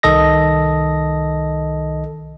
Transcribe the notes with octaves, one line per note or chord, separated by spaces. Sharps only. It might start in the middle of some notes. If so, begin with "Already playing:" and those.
C2 D#3 A4 D#5 A#6